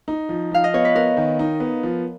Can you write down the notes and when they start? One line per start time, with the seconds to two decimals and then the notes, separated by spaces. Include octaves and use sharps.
0.08 D#4
0.29 F3
0.52 F3 F5
0.64 D#5
0.74 B3 C#5
0.85 B4
0.95 B3 A#4
1.17 D#3
1.39 D#4
1.60 B3
1.83 F3